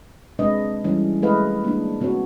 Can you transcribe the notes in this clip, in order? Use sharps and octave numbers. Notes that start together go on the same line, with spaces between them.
C3 G#3 D4 B4 D#5
E3 G3 C#4
G#3 A3 E4 B4 D#5 F5
A#3 D4
C3 B3 F#4 C#5